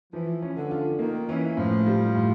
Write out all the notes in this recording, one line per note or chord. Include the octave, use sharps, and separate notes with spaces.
E3 F3
C#4
D3
F4
D#3 A#3
E3 C#4
A2 F3
G3
A2